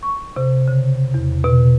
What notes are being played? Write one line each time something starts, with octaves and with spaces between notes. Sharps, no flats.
C#6
C3
C#3
E2
B2